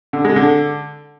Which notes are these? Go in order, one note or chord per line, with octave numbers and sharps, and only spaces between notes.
D3
G#3
D3